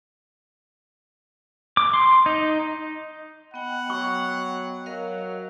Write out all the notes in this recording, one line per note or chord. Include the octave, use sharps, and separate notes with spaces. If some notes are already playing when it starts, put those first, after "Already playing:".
D6
C6
D#4
B3 D#5 F#5 G5
F#3 C#6
F#3 A#4 D#5 F5